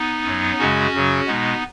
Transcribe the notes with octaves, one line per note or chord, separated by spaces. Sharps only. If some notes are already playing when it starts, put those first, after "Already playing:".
Already playing: B3 D#4
F#2 F#3
F#2 C#3 G#3 C#4 F#4
F#2 C#3 F#3
B2 G#3 B3 D#4